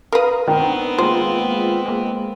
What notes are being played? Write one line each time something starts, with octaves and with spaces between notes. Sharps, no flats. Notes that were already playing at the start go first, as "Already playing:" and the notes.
A#4 B4 F5 A#5 D#6
D#3 B3 C4 D4
G#3 A#3 F4 C5
G#3 A#3